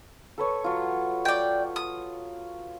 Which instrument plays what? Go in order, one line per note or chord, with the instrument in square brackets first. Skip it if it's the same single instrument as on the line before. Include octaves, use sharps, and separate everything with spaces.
[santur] A4 B4 C#5
F#3 F4
[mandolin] D5 G5
D#6